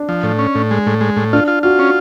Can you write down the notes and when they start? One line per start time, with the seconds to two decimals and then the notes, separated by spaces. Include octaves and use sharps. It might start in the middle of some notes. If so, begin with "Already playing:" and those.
Already playing: D4
0.09 F3
0.23 A2
0.39 C#4
0.55 A2
0.71 G#3
0.86 A2
1.01 G#3
1.17 A2
1.33 D4 F4
1.48 F4
1.63 F4 F#4
1.79 C#4